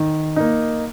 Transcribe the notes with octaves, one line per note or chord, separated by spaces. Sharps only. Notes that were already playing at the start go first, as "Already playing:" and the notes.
Already playing: D#3
A#3 D#4